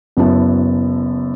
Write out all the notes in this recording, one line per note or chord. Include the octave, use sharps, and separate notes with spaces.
F#1 F#2 B3 E4 A5